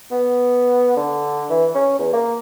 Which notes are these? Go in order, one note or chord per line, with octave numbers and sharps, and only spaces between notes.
B3
D3
E3
C#4
E2
A#3